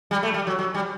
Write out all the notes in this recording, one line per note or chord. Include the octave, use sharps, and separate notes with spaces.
G3
A3
G3
F#3
F#3
G3